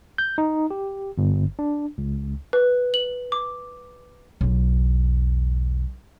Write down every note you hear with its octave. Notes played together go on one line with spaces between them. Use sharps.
G6
D#4
G4
G1
D4
C#2
B4
F#7
D6
B1 E2